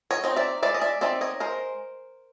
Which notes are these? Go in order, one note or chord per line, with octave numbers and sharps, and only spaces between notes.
C#5 D#5
C4 D#4
D5 E5
G#3 D5 E5
D#5
D5 E5
C4 D#4 D5 E5
C#5 D#5
G#3 A#4 C5